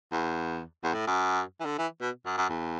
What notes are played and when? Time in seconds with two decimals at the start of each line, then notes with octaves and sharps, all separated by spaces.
0.12 E2
0.83 E2
0.94 A2
1.07 F#2
1.60 E3
1.66 D3
1.78 E3
2.01 B2
2.26 F#2
2.37 F#2
2.49 E2